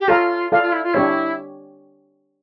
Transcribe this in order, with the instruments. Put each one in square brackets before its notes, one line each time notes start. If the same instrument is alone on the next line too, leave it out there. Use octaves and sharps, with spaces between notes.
[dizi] G4
[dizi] F4 [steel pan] A4 C#5 F5 A#5
[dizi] F4 [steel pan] A4 D5 F5
[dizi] F4
E4
F4
[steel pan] D4 G4 C#5 [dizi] E4